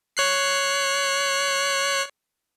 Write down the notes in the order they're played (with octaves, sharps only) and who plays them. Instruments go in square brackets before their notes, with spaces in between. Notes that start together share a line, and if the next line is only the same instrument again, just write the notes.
[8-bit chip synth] C#5 F#6 C7